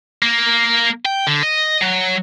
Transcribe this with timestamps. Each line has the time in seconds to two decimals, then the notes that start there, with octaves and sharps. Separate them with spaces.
0.23 A#3
1.05 G5
1.27 D3
1.43 D#5
1.82 F#3